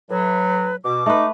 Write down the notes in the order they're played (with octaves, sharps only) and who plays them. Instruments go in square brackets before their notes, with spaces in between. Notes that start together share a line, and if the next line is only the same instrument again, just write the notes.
[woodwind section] A2 F#3 [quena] B4
[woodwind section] B2 [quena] D6
[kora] A3 B4 [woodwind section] D#4